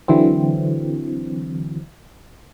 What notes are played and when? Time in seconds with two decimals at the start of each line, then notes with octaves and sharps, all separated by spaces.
0.08 D3 E3 F#3 C4